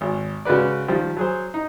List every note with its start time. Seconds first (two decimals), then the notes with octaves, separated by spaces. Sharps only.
0.01 G#1
0.45 C#3 G#3 F#4 B4 D5
0.88 D#3 F3 G3
1.17 F#3 G#4 C5
1.54 D#4